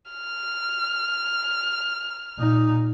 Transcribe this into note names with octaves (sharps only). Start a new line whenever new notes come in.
F6
A#2 D#4